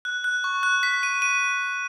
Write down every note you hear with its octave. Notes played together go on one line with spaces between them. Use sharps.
F#6
F#6
C#6
F#6
B6
D#7
D#7